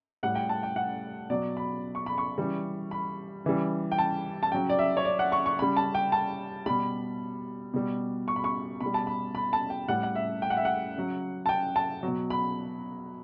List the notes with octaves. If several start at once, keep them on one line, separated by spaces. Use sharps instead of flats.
A2 G3 F#5
G5
A5
G5
F#5
B2 F#3 D5
B5
C#6
B5
C#6
C#3 E3 G3
B5
C#3 E3 G3
G5
A5
A5
C#3 F#3 G5
D5
E5
C#5
D5
F#5
C#6
C#6
C#3 G3 B5
A5
G5
A5
B2 G3 B5
B2 G3
C#6
B5
C#6
B2 B5
G3
A5
B5
B5
A5
G5
A2 G3 F#5
F#5
E5
G5
F#5
E5
F#5
C#3 F#3
A5
G5
A5
B2 F#3
B5